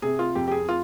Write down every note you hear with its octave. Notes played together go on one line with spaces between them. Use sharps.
C3 G#4
F4
F2 G4
G4
G#4
F4